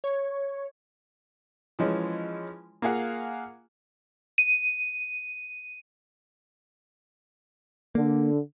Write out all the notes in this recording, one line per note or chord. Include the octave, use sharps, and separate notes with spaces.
C#5
E3 F3 G#3 C#4
A#3 F4 G#4 F5 F#5
D#7
D3 A#3